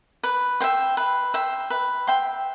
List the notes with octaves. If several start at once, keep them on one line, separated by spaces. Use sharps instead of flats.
B4
E5 G5 C6
B4
E5 G5 C6
B4
E5 G5 C6